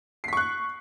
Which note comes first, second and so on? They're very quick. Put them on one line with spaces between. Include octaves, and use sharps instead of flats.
C7 B6 C#6 F#6